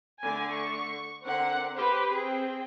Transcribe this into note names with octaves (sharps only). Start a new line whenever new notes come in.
D3 A3 G#5
C#6
D3 C4 A#4 F#5
G4 B4 C5
C4 G#4 G5